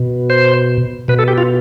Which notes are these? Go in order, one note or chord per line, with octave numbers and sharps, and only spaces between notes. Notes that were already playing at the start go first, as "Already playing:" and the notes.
Already playing: B2
C5
B2 B4
A4
G4
F4